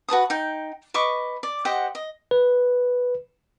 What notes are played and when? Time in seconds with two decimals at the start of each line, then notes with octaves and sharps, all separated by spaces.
0.08 F#4 B4 A5 D#6
0.30 D#4 G5
0.94 B4 D#5 C#6 D6
1.43 D5
1.65 G4 C5 D#5 F#5
1.95 D#5
2.31 B4